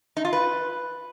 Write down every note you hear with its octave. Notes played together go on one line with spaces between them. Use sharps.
D#4
F4
B4